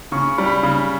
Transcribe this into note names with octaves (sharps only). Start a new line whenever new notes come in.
C#3 C#6
G3
B5
C#3